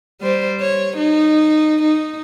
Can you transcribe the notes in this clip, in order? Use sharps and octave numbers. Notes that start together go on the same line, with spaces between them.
G3 C5
C#5
D#4
D#4